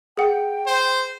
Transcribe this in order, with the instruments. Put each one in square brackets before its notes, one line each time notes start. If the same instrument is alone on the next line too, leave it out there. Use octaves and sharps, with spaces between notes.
[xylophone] G#4 F#5 [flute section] G5
[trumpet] C5